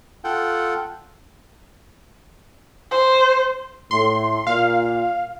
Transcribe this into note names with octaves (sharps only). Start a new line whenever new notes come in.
F4 A4 F#5 G5
C5
A2 C6
A#2 F5